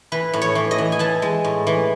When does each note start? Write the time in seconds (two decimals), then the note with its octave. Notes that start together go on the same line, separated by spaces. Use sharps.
0.12 E3 B4
0.33 A2
0.42 C#5
0.55 E3
0.71 D#5
0.78 E3
0.92 G#5
0.99 E3 A5
1.22 G#3
1.44 A2
1.67 E3